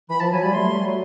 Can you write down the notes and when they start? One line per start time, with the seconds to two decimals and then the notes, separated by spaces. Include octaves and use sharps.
0.09 E3 B5
0.20 F3 A5
0.32 F#3 G#5
0.43 G3 B5
0.54 A3 C6
0.69 G3
0.83 F#3